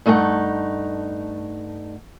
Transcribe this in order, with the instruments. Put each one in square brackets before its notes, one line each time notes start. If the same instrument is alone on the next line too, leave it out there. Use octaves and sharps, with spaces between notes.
[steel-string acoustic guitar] G2 A3 D#4 A4 F#5